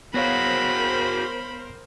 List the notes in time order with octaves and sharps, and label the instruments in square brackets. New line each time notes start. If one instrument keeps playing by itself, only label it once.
[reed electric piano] B3 C#5 F5 [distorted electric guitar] F#4 G#4 [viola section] A#4 C5 [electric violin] B5